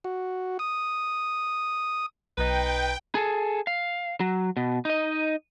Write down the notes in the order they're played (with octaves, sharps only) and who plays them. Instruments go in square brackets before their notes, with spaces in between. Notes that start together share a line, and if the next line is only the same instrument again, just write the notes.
[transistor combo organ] F#4
D#6
[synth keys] B1 [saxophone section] D#4 B4 [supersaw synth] G5
[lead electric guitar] G#4 A4
F5
F#3
B2
D#4 D#5